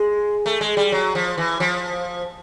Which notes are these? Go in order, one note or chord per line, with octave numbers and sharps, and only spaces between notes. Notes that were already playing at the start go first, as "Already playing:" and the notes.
Already playing: G#3
A3
G#3
G3
F#3
F3
E3
F3